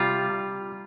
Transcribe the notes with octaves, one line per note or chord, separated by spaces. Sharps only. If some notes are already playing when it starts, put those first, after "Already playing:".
Already playing: C3 G3 F4